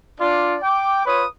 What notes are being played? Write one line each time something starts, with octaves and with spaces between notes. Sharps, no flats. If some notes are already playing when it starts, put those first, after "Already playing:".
D4 F4 D5
G5 D6
F4 B4 C#5 D#6